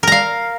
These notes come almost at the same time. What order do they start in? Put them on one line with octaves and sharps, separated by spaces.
A#4 A#5 F5